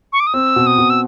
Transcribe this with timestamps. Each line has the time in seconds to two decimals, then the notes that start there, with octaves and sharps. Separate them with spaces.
0.13 C#6
0.20 D6
0.27 D#6
0.34 C4 E6
0.56 B2
0.67 D#6
0.78 B2
0.90 E6